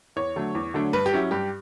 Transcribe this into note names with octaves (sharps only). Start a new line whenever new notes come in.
E2 C#5
D3 F#3 A3 D4
E2
D3 F#3 A3 D4
G2 B4
G4
F#3 C#4 E4
G2 G4